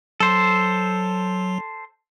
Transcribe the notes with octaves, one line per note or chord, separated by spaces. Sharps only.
F#3 A4 C5